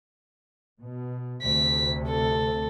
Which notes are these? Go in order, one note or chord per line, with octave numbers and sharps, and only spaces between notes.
B2
D2 C3 B6
A4